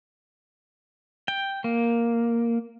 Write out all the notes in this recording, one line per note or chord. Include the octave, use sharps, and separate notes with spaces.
G5
A#3